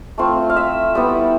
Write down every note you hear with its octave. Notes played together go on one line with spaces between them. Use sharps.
A3 C4 F4
F5
E5
G3 B3 E4